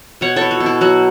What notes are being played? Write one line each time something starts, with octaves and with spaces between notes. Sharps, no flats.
B2 C#5 F#5
E4 A4 C#5
F#4
B2
E4
F#3 F#4